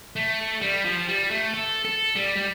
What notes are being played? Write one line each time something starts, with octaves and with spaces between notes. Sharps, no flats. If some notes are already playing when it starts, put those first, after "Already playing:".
A3
G3
F3
G3
A3
A4
A4
G3
G3